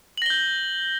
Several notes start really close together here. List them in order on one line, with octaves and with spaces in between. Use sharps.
F#7 A#6 G7 G6